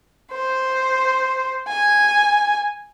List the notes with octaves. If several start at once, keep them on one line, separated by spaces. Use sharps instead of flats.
C5
G#5